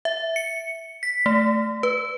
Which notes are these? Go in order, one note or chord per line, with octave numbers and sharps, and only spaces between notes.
E5
C#7
B6
A3
B4